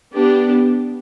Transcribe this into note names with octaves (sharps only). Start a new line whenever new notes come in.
B3 D4 G4